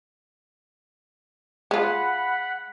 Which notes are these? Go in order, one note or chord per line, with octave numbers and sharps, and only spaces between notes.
G#3 F4 F#5 B5